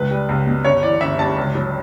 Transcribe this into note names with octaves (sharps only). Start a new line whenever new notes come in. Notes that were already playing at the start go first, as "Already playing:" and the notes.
Already playing: C#2 B4
G3
C#2
B2
G1 C#5
E3 D5
G1 E5
G2 A5
C#2
F#3